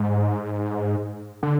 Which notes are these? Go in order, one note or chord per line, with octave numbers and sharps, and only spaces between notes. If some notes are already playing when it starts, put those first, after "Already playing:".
Already playing: G#2
D3